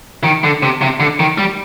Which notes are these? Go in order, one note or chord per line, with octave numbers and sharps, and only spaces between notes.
D#3
D3
C3
C3
D3
D#3
G3